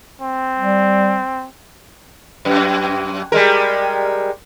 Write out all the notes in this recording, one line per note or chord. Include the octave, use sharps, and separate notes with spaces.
C4
G3
F#2
G3 G#3 A#4